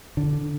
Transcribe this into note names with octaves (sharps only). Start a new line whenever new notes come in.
D3